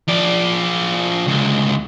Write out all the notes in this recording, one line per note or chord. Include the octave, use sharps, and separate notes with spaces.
F3 D5
C#2 D3